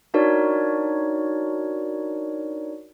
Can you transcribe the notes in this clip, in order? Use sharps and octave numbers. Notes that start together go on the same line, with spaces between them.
D4 D#4 F#4 A#4 C#5 D5